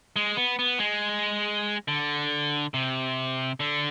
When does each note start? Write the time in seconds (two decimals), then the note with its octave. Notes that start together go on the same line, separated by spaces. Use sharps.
0.16 G#3
0.37 B3
0.59 B3
0.80 G#3
1.88 D3
2.74 C3
3.60 D3